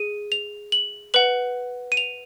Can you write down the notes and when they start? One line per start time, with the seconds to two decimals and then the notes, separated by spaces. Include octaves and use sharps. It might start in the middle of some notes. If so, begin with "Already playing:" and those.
Already playing: G#4 D#7
0.32 F7
0.72 F#7
1.14 B4 F#5 F#7
1.92 D#7
1.97 F7